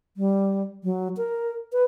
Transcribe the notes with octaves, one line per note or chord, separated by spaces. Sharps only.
G3
F#3
A#4
B4